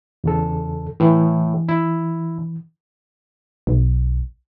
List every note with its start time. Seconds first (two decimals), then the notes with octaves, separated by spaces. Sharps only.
0.24 E2 C#3 A4
1.00 A2 E3
1.69 E4
3.67 B1